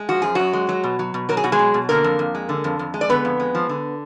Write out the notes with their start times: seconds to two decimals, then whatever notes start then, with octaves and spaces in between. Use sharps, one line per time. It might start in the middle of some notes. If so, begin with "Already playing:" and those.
Already playing: G#3
0.09 F3 F#4
0.22 F#2 G#4
0.35 F#2 F#3 F#4
0.53 G#3
0.69 F#3
0.84 B2
0.99 F#3
1.14 B2
1.29 F#3 A#4
1.37 G#4
1.44 B2 F#4
1.52 G#3 G#4
1.59 F#3
1.74 B2
1.89 D3 A#3 A#4
2.04 F2
2.19 F2
2.35 G#3
2.49 D3
2.64 F2
2.79 F2
2.94 G#3
3.01 D5
3.09 D3 B3 B4
3.25 F2
3.40 G#3
3.55 F3
3.69 D3